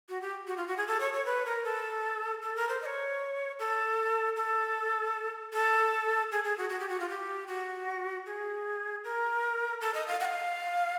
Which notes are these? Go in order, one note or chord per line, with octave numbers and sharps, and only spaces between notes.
F#4
G4
F#4
F4
F#4
G#4
A4
C#5
C#5
B4
A#4
A4
A4
A#4
C5
D#5
C#5
A4
A4
A4
G#4
G#4
F#4
F#4
G4
F#4
F4
G4
F#4
G#4
A#4
A4
D#5
F5
F#5
F5